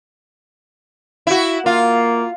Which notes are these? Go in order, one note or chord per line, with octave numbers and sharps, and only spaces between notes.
E4 F#4
A#3 F4